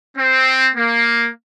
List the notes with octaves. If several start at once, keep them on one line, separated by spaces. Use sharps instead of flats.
C4
A#3